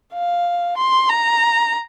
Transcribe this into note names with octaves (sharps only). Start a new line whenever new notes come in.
F5
C6
A#5